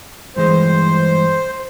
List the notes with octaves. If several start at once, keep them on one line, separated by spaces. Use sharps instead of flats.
G2 E3 G#3 C5